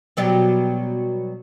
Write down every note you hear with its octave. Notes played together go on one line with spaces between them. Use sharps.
B2 F#3 G3